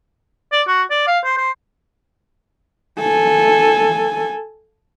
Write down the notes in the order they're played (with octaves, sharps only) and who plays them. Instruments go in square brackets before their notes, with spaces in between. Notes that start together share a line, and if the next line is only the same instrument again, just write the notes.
[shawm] D5
F#4
D5
F5
C5
C5
[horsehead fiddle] A4 G#5